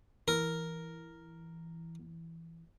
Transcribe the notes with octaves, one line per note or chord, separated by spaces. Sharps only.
E3 A#4